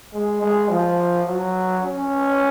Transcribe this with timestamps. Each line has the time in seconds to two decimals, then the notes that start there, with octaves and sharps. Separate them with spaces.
0.13 G#3
0.41 G#3
0.70 F3
1.26 F#3
1.83 C#4